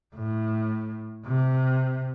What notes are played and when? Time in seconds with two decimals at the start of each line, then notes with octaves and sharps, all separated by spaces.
0.15 A2
1.26 C3